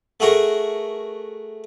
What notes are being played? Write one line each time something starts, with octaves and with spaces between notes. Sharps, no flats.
A3 F#4 G#4 A#4